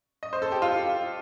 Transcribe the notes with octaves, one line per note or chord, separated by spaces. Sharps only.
D#5
C5
A4
G4
F4